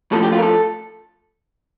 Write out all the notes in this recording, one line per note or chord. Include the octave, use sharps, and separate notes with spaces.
A2 F3 A3 A4
G4
F4
A#4
A4